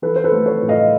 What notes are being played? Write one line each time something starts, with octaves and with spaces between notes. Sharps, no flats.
E3 A4 B4
C5
A4 B4
A3
B4 C#5
A2
D#5 F5